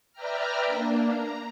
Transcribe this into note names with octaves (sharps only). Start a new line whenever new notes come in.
B4 D5 E5 G5 A#5 F6
A#3 D4
A#5